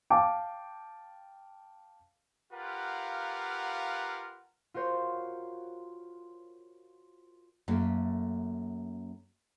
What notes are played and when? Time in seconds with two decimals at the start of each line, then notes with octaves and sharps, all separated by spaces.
0.10 F5 G5 A5 D6
2.53 F4 G4 A#4 B4 F5 F#5
4.74 F4 F#4 A#4 C5 C#5
7.68 F#2 A3 A#3